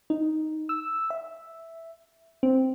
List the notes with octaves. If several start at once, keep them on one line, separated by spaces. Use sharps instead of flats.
D#4
E6
E5
C4